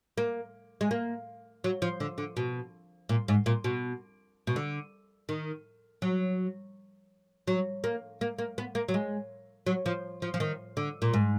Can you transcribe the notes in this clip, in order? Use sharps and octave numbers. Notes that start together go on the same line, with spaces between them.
A#3
G#3
A#3
F#3
F3
D3
D3
B2
A#2
G#2
A#2
B2
B2
D3
D#3
F#3
F#3
A#3
A#3
A#3
B3
A#3
F#3
G#3
F#3
F3
F3
F3
D#3
D3
A#2
G#2